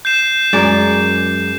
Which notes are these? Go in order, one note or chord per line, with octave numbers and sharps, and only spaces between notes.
G6 C7 E7
F#2 G#3 D5